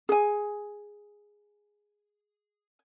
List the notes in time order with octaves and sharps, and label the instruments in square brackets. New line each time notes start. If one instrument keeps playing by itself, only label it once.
[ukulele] G#4 G#5